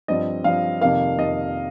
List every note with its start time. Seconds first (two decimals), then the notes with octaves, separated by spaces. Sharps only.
0.08 G2 F3 C4 D#5
0.44 G2 F3 C4 F5
0.81 F2 C3 D#3 A#3 F5
1.18 F2 C3 D#3 A#3 D#5